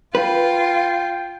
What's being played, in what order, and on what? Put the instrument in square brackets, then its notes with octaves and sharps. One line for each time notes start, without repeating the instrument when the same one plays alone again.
[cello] F4 [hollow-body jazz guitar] B4 [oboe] G5